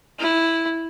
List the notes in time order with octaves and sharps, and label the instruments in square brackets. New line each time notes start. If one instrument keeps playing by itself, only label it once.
[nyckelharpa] E4